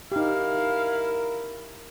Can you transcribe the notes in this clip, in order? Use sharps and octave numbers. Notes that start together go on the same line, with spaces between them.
D#4 E4 G4 A#4 F5